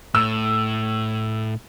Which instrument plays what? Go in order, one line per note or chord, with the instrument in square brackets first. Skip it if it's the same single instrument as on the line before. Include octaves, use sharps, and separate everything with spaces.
[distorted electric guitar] A2 [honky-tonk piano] E6